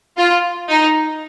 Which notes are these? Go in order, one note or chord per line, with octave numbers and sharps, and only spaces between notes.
F4
D#4